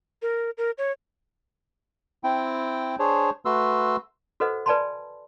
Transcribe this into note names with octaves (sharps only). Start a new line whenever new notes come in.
A#4
A#4
C#5
C4 E4 G5
D4 G#4 C5 C#5
A3 F#4 B4 C6 E6
F#4 A4 B4 C5 D#5 F#5
B4 D5 G#5 A5 B5 C6